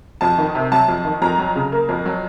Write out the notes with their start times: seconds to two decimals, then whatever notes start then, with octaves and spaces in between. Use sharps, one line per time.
0.21 F2 A5
0.38 D#3
0.55 C3
0.72 F#3 A5
0.89 F2
1.05 D#3
1.22 F2 A#5
1.39 F#3
1.56 C#3
1.72 A#3
1.89 F2
2.05 F#3